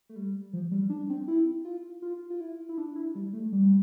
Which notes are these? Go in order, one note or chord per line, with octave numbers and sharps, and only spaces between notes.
A3
G3
F3
G3
D4
C4
E4
F4
F4
F4
E4
E4
D4
E4
G3
A3
G3